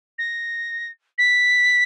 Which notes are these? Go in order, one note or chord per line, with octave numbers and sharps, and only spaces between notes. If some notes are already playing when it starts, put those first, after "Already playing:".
A#6
B6